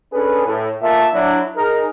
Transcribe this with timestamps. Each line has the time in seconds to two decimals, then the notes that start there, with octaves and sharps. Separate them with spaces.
0.13 C#4 D4 G#4 A4 B4
0.46 A2
0.82 A#2 E5 A5
1.13 F#3 D4 E4
1.56 D#4 G#4 A#4